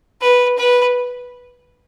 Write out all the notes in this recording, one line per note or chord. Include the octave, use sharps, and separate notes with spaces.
B4
B4